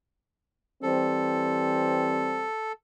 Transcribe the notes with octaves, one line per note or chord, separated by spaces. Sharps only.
E3 G3 C4 A4